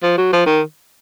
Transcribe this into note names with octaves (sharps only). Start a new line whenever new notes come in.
F3
F#3
F3
D#3